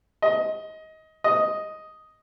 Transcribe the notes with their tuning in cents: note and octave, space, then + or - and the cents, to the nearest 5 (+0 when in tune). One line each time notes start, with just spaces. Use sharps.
D#5 +20
D#5 +5